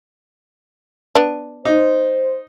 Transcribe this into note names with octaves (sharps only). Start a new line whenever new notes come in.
B3 D4
D#4 C5